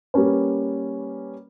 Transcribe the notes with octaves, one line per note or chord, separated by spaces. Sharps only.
G3 A#3 C#4 B4